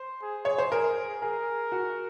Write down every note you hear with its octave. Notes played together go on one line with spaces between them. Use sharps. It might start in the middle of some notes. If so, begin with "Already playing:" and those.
Already playing: C5
G#4
C#5
C5
G#4 A#4
G#4 A#4
F#4